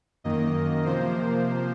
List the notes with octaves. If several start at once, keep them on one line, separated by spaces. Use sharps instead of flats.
F#2 D#3 A#3 D#5
C3 F3 A#3 C5